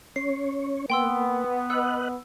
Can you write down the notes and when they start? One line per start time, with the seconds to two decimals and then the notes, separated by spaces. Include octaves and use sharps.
0.16 C#4 C#5 C7
0.90 A#3 B3 G5 C6 E6
1.70 B4 D#5 F#5 E6 F#6